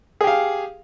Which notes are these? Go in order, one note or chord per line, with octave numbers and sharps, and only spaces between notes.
G4 G#4 F5